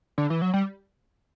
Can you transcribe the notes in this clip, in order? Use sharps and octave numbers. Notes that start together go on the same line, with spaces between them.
D3
E3
F#3
G3